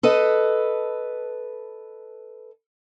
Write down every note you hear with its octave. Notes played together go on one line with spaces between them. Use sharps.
A4 B4 D#5